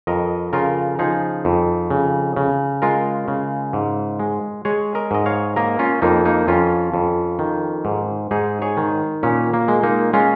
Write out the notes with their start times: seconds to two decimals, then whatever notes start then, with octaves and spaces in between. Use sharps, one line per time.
0.07 F2 A#4 D#5
0.53 C#3 F4 A#4
0.99 F3 D#4 G#4
1.45 F2
1.90 C#3
2.36 C#3
2.82 G#3 F4 A#4
3.28 C#3
3.73 G#2
4.20 G#3
4.65 G#3 G#4 C#5
4.95 A#4 D#5
5.11 G#2 D#5
5.26 C#5 F5
5.56 A#3 A#4 D#5
5.79 C#4 F4
6.02 F2 A#3 D#4
6.25 A#3 D#4
6.48 F2 C#4 F4
6.94 F2
7.39 D#3
7.85 G#2
8.31 G#2 D#4 G#4
8.62 G#4 C#5
8.77 D#3
9.23 A#2 C#4
9.54 A#3
9.68 G#3
9.83 A#3 D#4
10.13 G#3 C#4 F4